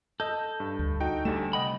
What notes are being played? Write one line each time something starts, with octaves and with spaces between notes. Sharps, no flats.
A4 D#5 G6
G2
D2
D#4 F#4 G5
D2 G3 A3 E7
C2 D#5 F#5 G5 B5